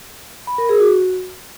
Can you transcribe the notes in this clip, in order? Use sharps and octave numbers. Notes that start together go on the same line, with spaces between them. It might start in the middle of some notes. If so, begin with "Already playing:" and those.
B5
A#4
G#4
F#4